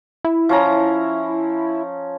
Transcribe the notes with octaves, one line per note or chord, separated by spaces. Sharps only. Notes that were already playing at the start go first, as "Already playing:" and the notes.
E4
F3 C#4 A#5